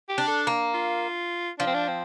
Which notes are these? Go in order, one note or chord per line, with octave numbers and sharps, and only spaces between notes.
G4
D4
A4
A#3
F4
F3 D4
C4
D4
C4